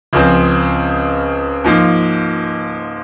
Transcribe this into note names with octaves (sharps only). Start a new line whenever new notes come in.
C#2 C#3 F3 C4
G#2 F3 A#3